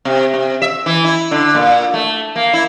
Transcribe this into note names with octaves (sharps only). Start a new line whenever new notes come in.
C3
C3
E5
E3
E4
D3
A#2
A3
A#3
E4